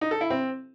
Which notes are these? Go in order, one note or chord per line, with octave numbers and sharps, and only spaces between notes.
D#4
A4
E4
C4